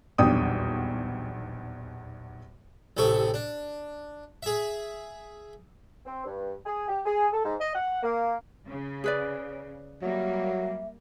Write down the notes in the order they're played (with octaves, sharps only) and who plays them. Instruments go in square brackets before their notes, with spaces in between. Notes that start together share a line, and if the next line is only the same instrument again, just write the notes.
[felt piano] D#1 B1 E2 D4 G5 D#6
[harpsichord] A1 C3 A4 C#6
D4
G#4 E5
[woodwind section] C4
G2
G#4
G4
G#4
A4
G#2
D#5
F#5
A#3
[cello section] C#3
[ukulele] G#4 B4 D5
[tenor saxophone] F#3 [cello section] G3 A#3 [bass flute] E5